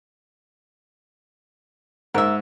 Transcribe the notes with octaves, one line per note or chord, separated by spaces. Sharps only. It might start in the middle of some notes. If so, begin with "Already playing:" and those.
G#2 A#4 E5